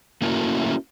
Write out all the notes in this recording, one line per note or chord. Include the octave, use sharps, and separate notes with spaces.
A3 A#3 C#4 E4 F#4 A#4